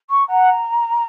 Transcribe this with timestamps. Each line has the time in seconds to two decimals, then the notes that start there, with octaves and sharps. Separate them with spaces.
0.10 C#6
0.28 F#5 A#5